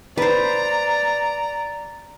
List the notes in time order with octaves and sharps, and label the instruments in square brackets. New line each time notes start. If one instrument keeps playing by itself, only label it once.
[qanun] B4 C5 [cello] D5 [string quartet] A#5